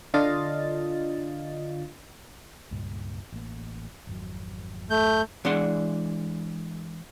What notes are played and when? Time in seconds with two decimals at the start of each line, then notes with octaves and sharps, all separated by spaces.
0.14 D3 D4 F4 D#5 F5 A6
2.71 C#2 G2 A#2
3.32 A1 A#3
4.07 G#1 F2 F#3
4.90 A3 G6
5.45 E3 G#3 D4 D5 F#5 C6